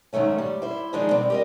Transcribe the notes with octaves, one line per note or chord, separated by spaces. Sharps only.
G#2 D#3 F#3 A3 C#4
G3
E4 C5
D#3 F3 G#3 D4 D#4
B2 G3 C4
G4 A#4 D#5